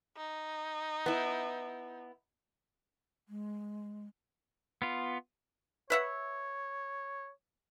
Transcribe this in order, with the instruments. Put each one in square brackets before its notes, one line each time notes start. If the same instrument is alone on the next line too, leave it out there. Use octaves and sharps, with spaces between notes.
[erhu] D#4
[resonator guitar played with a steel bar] B3 E4
[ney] G#3
[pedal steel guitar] B3 F4
[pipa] B4 E5 F#5 [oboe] C#5